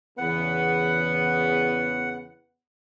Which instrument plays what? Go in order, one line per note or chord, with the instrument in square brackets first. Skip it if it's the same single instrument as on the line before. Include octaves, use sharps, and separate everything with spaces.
[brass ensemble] E2 C#3 B3 [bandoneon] F#5